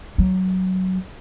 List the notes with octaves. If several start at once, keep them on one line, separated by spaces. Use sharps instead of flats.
F#3